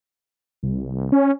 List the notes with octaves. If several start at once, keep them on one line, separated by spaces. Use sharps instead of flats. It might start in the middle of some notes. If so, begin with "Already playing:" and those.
C2
C#4